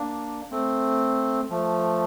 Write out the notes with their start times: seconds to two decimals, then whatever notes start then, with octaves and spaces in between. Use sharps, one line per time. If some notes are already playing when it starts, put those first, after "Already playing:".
Already playing: A#3 D4
0.51 A3 C4
1.50 F3 A3